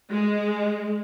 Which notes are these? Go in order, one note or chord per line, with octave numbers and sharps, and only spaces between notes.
G#3